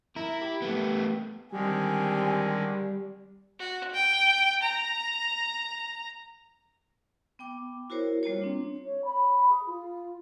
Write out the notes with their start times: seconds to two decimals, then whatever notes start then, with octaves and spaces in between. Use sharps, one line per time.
0.16 E4 A#4
0.42 G4
0.62 A3 B3
1.52 D3 D#3 G3 G#3 C4 G4 G#5
3.59 F#4
3.94 G5
4.62 A#5
7.39 B3 G5 D6
7.90 E4 F#4 A#4 C5 C#5
8.23 G3 A#3 F4 C#5
8.42 C4 D4
8.84 C#5
9.05 B5
9.49 G#4
9.67 F4